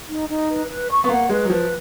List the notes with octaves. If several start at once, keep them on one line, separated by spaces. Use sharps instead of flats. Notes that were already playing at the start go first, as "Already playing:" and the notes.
D#4
D#4
B4
B4
C#6
B3
A#3 F#5
G#3 B4
F#3
F3 B4